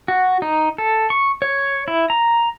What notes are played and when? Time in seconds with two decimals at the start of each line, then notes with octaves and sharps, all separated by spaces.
0.08 F#4
0.42 D#4
0.78 A4
1.10 C#6
1.42 C#5
1.88 E4
2.10 A#5